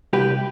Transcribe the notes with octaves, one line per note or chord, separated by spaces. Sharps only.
C2 G4 B4